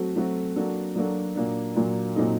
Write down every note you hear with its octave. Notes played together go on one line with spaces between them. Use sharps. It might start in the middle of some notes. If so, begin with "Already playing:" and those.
Already playing: F#3 A3 C4 F#4 A4
F#3 A3 C4 F#4 A4
F#3 A#3 D4 F#4 A4
F#3 A#3 D4 F#4 A4
A#2 F#3 A#3 D4
A#2 F#3 A#3 D4
A#2 F#3 C4 D#4 A4